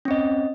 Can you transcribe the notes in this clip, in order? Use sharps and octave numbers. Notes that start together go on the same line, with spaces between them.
C4 C#4 D#5